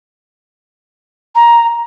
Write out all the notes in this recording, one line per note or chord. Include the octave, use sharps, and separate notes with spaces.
A#5